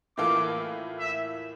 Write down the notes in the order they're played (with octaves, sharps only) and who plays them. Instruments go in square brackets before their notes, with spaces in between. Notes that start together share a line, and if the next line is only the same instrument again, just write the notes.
[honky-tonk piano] A2 E3 A#3 F4 A4 [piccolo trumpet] D6
[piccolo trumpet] E5